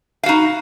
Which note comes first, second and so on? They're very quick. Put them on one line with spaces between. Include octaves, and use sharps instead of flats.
F5 F#4 D#4